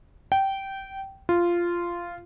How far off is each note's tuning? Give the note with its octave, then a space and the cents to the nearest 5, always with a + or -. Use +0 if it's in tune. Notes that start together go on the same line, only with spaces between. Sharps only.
G5 -15
F4 -10